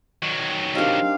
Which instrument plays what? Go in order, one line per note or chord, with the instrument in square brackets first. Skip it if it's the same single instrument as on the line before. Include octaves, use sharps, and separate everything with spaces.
[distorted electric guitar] D#3 F#3
[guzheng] C4 D4 [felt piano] D#4 G4 A#4 [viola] F5